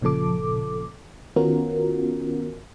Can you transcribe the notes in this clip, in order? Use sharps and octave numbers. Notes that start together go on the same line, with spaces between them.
G1 A#2 C#3 F3 A4 D6
D#3 B3 C#4 F4 F#4 A#4